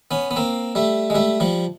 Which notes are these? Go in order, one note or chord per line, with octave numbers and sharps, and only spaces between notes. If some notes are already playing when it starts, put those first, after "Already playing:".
B3 C#4
B3
A#3 C4
G3 A3
G#3
G3 A3
F3 G3